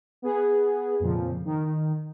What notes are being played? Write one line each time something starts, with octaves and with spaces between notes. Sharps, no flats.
B3 G#4
F2 A#2 C#3 F3
D#3